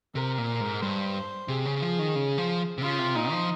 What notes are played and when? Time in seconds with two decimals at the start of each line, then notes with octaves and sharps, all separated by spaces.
0.15 C3 A#4
0.38 A#2
0.60 G#2
0.82 G2 C5
1.48 C3 G#4
1.66 C#3
1.82 F3
1.99 D#3
2.15 C#3
2.38 F3
2.78 C3
2.82 C#3 F4
2.99 C3
3.15 A#2 D#4
3.32 F3